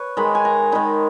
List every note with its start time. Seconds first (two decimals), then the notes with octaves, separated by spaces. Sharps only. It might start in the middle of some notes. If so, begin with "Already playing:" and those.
Already playing: B4 C#5
0.17 D#3 G#3 D#4 B5
0.35 G#5
0.45 A#5
0.72 D#3 G#3 D#4 B5